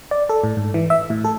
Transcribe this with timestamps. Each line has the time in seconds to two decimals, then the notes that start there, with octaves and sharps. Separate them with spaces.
0.11 D5
0.29 A4
0.44 A2
0.57 G#2
0.74 E3
0.90 E5
1.10 A2
1.24 A4